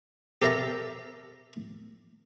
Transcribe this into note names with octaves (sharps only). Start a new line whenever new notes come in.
G4 A4 A#4 E5 A5 A#5